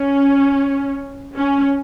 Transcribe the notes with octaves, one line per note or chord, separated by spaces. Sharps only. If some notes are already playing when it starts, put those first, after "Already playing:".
Already playing: C#4
C#4